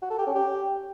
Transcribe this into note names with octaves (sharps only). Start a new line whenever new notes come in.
F#4
A4
G4
C#4
G4